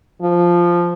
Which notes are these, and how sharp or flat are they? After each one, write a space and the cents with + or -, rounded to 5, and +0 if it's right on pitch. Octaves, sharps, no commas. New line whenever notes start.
F3 -5